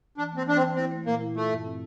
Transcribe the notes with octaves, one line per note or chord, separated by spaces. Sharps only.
E3 D4
A#3 C4
E3 D4
C4
E3
C4 E4
A3
A#2 A#3
E4
A3 F4
G2
C4